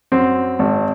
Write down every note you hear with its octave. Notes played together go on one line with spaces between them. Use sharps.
F#2 C4
G#1